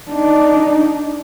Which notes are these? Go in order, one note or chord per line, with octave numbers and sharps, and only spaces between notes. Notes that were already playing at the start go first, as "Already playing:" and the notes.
D4 D#4